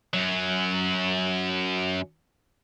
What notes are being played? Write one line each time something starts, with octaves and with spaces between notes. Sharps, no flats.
F#2 F#3